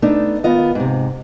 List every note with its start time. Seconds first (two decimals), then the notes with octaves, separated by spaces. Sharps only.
0.02 A3 B3 D4 D#4
0.44 D#3 B3 F4 D#5
0.75 G#2 C3